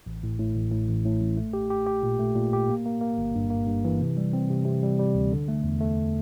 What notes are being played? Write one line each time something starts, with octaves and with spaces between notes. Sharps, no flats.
A1
A2
A2
A1
A2
A1
A2
A1
A3
G4
G4
G4
A#2
A3
A#2
G4
A#3
A#3
A#3
G1
G2
A#3
G2
E3
C3
G3
C4
C3
C3
G3
G3
D2
D3
A3
E2
A3